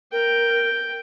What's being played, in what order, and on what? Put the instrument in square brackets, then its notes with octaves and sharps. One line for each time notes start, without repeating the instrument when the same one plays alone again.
[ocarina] A#4 [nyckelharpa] G5